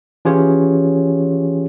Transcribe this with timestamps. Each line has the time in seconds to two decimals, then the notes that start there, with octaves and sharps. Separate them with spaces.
0.25 E3 C#4 F4 G4 G#4 C#5